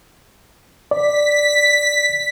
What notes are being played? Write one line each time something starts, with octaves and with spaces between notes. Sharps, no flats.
D5 B6